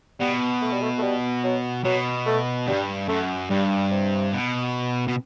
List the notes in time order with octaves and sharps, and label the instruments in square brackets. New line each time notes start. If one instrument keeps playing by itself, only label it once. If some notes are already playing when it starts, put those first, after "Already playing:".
[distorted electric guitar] B2 [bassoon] G3
[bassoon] A3
G3
A3
A3
G3
F#3
[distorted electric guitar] B2 [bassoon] F#3
[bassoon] A3
[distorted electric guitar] G2 [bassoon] G3
[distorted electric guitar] F#2 [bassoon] A3
[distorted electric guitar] G2 [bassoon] G3
[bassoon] C3
[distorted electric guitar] B2
B2